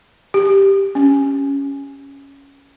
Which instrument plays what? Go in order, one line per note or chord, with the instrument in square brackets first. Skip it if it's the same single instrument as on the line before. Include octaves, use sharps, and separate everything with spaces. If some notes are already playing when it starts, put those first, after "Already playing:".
[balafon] G4
C#4